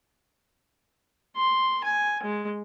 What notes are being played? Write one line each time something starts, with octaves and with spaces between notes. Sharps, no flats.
C6
G#5
G#3